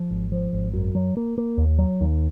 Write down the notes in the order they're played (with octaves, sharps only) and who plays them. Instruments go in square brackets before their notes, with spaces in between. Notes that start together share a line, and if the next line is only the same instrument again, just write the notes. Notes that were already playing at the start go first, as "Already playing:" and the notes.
Already playing: [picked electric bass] F3
G#1
F3
G#1
F#2
F#3
A#3
A#3
D#2
F#3
D#2